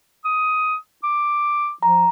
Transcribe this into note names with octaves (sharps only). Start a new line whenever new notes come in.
D#6
D6
F3 A#5